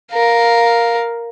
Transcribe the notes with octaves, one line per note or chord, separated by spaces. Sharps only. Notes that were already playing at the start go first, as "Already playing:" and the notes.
A#4 F5